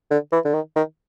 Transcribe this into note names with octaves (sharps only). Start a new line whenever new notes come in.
D3
E3
D3
D#3
D#3